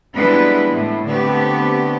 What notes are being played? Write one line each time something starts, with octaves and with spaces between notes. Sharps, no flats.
E3 G3 G#3 B3 D4 B4
A2
D3 A3 B3 C4 G4